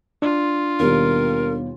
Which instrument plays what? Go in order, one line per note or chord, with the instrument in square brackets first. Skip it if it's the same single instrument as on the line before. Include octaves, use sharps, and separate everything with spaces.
[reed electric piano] D4 [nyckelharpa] F4
[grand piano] D#2 B2 G3 [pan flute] A#4